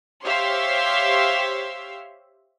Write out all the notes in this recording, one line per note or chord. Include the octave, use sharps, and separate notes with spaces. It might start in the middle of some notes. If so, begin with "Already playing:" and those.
G4 C5 C#5 E5 F5 C6